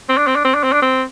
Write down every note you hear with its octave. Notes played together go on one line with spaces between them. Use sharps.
C4
D4
C4
D4
C4
D4
C4
D4
C4